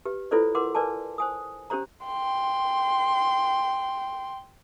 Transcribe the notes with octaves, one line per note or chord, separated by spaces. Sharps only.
G4 B4
E4 F4 A4 B4 C5 D5
A#4 F#5 C6 D6
A#4 B4 D5 G#5 A5
C5 G#5 D#6
C#4 G4 C5 C#5 A#5
G5 C6